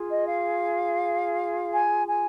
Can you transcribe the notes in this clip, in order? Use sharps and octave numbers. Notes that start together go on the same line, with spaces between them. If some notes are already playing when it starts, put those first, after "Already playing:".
Already playing: F4 G#4
D#5
F5
G#5
G#5